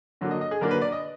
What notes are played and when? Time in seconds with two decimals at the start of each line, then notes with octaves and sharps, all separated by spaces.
0.21 D3 F#3 A#3 D4
0.31 D#5
0.41 D#5
0.51 G#4
0.61 D3 F#3 A#3 D4 A#4
0.71 B4
0.81 D5
0.92 D#5